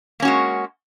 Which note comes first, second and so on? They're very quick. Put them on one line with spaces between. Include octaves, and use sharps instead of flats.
A#3 C#4 F#4 G#3